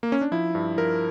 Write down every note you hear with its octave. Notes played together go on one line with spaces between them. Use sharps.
A#3
C#4
D4
F3 E4
G2
F3 A#4